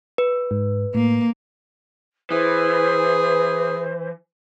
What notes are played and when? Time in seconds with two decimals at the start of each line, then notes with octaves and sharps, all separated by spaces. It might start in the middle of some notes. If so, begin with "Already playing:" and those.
0.18 B4
0.51 G#2
0.95 A2 A#3
2.31 E3 G#4 B4 C5